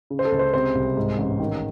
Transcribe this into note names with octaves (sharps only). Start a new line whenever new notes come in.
C#3
C5
A4
C#2
C5
C3 C5
C2
G#2
A1
D#3